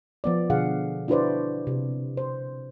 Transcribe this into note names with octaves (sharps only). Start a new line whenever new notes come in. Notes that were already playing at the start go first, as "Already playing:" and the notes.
F3 B3 D5
B2 D3 G#4 F5 F#5
D4 E4 F#4 B4 C5 D5
C3
C5